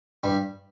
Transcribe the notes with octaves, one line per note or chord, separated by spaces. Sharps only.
G2 G3